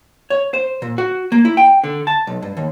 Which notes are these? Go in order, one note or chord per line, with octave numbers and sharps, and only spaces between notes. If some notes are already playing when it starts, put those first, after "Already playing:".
C#5
C5
A#2
F#4
A#3
E4
G5
D3
A5
B1
G2
D#2